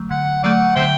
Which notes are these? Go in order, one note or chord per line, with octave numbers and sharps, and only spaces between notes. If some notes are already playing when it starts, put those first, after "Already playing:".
Already playing: D3 F#3 A3
D3 F#5
F#3 A3 D5 F#5
D3 C5 E5 G5